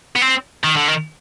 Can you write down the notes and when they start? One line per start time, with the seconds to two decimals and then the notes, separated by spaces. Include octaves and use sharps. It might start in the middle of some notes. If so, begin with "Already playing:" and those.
0.16 B3
0.21 C4
0.64 D#3
0.77 D3
0.88 D#3